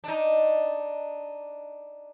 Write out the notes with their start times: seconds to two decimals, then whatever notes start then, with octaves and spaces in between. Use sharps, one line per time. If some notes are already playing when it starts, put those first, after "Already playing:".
0.04 D4 D#4